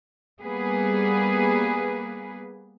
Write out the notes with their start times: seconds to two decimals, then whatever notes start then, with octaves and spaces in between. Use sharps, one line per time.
0.42 G3 A#3 B3 G#4 B4